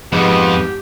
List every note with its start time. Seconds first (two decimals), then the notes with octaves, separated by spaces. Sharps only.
0.13 F2 G#2 B3 G4